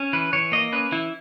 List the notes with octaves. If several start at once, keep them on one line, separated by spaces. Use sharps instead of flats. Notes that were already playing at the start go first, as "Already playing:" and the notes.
Already playing: C#4
E3 B4
E3 C#5
A#3 D#5
C#4 B4
E3 E4